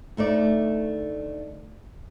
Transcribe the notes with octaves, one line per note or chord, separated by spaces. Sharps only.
D2 A3 D#4 D5